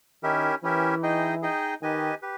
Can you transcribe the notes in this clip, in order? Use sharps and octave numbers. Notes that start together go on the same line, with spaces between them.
D#3 C#4 E4 G4 A#4 E5
E3 C#4 E4 G4 A#4 E5
D#4 G#4 D#5 G5
D#4 G#4 D#5 G5
D#3 G4 B4 D#5 G#5
G4 B4